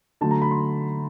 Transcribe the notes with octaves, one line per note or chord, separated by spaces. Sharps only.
D3 F#3 A3 A5
A#5
B5
C6